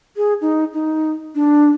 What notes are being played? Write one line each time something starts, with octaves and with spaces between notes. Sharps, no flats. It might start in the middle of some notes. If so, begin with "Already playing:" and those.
G#4
D#4
D#4
D4